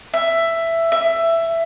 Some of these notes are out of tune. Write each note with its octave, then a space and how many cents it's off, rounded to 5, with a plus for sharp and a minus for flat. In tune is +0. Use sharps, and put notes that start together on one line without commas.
E5 +10
E5 +15